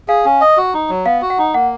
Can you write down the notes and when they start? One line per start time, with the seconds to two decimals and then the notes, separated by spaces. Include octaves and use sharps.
0.08 G#4 F5
0.25 C#4
0.41 D#5
0.57 F#4
0.74 D#4
0.89 F#3
1.05 B3 F5
1.22 F#4
1.30 F#5
1.38 D#4
1.54 A#3 F#5